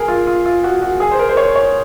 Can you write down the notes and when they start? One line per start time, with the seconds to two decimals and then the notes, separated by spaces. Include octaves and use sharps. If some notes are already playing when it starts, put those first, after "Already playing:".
Already playing: G#4 A#4
0.08 F4
0.27 F4
0.46 F4
0.64 F#4
0.82 F#4
1.00 G#4
1.12 C5
1.19 A#4
1.29 C5
1.37 C#5
1.56 C#5